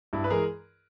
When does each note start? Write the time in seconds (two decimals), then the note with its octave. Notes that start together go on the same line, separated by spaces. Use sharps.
0.13 G2 E4
0.24 B4
0.30 E3 G#3 G#4 A#4